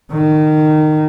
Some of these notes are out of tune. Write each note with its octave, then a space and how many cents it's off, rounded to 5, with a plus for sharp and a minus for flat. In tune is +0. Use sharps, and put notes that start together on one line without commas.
D#3 -20